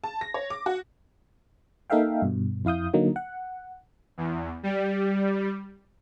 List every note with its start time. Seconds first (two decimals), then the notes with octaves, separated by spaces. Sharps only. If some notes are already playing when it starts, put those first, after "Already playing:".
0.04 A5
0.21 A#6
0.34 C#5
0.50 D6
0.66 F#4
1.90 A#3 D#4 A4 E5 F5 G5
2.22 G2 B2
2.65 F2 E4 F5 D#6 G6
2.94 D3 F#3 A#3 D#4
3.16 F#5
4.17 E2
4.63 G3